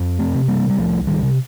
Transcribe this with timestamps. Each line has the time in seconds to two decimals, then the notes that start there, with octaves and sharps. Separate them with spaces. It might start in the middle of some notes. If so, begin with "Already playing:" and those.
Already playing: F2
0.19 A3 C4
0.34 C3
0.48 G3 A#3
0.70 G3
0.77 C2 F3 A3
1.07 D#3 G3
1.23 C3